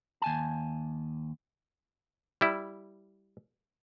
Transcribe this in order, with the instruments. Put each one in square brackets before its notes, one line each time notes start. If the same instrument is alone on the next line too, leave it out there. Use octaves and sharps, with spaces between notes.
[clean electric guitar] D#2 G#5 A5
[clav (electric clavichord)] G3 E4